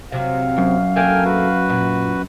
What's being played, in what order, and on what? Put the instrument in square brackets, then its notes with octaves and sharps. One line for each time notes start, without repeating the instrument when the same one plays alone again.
[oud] C3 F#3 [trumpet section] F5
[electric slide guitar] F#2
[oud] A3 A#3 D4 [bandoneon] G5 G#5 F6
[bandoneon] F#4 B4
[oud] A#2